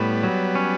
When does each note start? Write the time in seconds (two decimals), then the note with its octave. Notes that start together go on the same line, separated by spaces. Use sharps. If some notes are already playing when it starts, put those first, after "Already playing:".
Already playing: A2 G3 B3
0.23 F#3
0.55 C#4